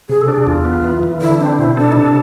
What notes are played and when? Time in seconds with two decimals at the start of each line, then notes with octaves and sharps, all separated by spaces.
0.09 C3 G#4
0.21 A4
0.28 D4
0.34 G#4
0.47 E2 F4
0.65 B3
0.84 E3
1.03 E3
1.21 D3 E4
1.40 C4 D4
1.59 B2 E4
1.77 D4 A4
1.92 E4
1.96 C3 D4